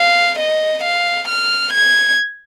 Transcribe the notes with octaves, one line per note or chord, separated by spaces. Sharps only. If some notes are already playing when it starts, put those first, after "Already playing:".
Already playing: F5
D#5
F5
F6
G#6